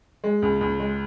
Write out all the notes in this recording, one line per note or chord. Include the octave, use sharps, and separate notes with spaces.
G#3
C#2
C#2
G#3